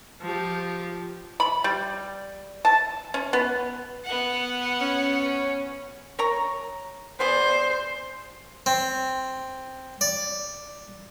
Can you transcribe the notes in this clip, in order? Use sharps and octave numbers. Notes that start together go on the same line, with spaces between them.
F3 G4
B5
G3
A5
C#4
B3
B3 F#5
C#4
A#4 C#5 A#5
B3 G#4 C5 D5
C4
D5